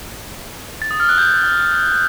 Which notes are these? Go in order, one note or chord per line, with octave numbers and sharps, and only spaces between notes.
A6
D#6
F6
F#6
G6